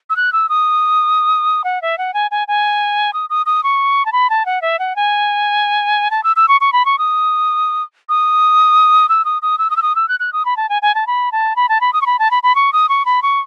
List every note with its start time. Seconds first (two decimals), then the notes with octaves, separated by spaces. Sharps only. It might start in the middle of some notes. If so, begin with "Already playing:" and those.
0.10 E6
0.16 F#6
0.33 E6
0.49 D#6
1.64 F#5
1.82 E5
1.98 F#5
2.14 G#5
2.31 G#5
2.48 G#5
3.13 D#6
3.30 D#6
3.46 D#6
3.64 C#6
4.06 A5
4.12 B5
4.30 A5
4.46 F#5
4.62 E5
4.79 F#5
4.96 G#5
6.11 A5
6.24 E6
6.36 E6
6.48 C#6
6.61 C#6
6.73 B5
6.85 C#6
6.98 D#6
8.09 D#6
9.09 E6
9.25 D#6
9.42 D#6
9.58 E6
9.70 D#6
9.76 E6
9.82 D#6
9.96 E6
10.08 F#6
10.20 F#6
10.33 D#6
10.45 B5
10.57 A5
10.69 G#5
10.82 G#5
10.95 A5
11.07 B5
11.32 A5
11.56 B5
11.69 A5
11.81 B5
11.93 D#6
12.02 C#6
12.06 B5
12.19 A5
12.31 B5
12.43 B5
12.55 C#6
12.73 D#6
12.89 C#6
13.05 B5
13.22 C#6